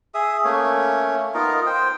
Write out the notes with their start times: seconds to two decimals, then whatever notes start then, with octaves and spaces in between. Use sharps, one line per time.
0.14 G#4 E5 D#6
0.45 A3 A#3 C#4 C#5
1.34 B3 D#4 F4 A#4
1.66 C5 G5